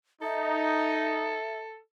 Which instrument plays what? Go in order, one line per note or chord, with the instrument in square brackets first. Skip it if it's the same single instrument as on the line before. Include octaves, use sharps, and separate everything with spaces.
[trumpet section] D#4 [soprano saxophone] A4 [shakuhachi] E5